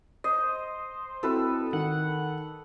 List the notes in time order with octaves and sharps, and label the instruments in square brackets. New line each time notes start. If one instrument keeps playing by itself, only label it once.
[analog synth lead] C5 [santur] D#5
[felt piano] C4 E4 F#4 [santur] A4 B4
[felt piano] D#3 [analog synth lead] F#5